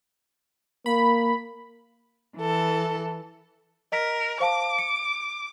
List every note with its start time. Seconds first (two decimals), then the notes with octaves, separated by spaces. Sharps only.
0.86 A#3 B5
2.37 E3 A4
3.92 A#4 D#5 B6
4.40 C5 F5 A5 D6
4.78 C#7